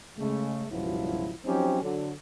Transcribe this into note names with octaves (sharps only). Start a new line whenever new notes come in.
C#3 G#3 A3
C#2 G2 B2 F3 F#3 E4
F3 F#3 C4 C#4 D#4 G4
D3 F#3